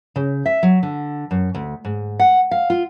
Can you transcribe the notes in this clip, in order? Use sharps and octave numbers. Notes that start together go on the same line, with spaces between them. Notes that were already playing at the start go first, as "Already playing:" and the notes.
C#3
E5
F#3
D3
F#2
D2
G#2
F#5
F5
F4